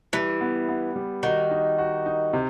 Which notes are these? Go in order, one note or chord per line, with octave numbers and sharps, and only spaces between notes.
E3 G3
B3
B3
G3
D#3 F#4
D#4
F#4
D#4
C3